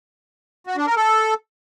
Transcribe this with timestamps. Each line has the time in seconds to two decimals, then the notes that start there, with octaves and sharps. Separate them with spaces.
0.67 F#4
0.77 D4
0.87 A#4
0.97 A4